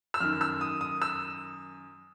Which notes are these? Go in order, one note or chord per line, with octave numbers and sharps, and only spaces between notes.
E6
F#2 D#3 F6
E6
D#6
D#6
E6